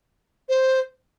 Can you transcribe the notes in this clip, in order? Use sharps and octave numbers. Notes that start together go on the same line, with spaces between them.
C5